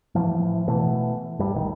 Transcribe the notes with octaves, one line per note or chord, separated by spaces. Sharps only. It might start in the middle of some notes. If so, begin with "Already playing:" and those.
A2 E3 F3
B2 E3 A3
G2 G3
A1 A2 D#3